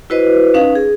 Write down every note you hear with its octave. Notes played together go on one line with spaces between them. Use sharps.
E4 F#4 B4 C5 D#5
C#4 D#4 B4 F5
G#4